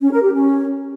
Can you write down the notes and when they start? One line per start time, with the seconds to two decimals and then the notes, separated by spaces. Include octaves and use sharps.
0.01 C#4
0.12 A#4
0.22 G4
0.33 C#4